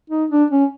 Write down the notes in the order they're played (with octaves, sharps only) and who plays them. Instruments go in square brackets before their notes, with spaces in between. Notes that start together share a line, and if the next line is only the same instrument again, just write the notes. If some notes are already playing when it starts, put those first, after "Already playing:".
[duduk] D#4
D4
C#4